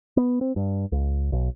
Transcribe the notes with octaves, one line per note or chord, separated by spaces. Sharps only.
B3
C4
G2
C#2
B1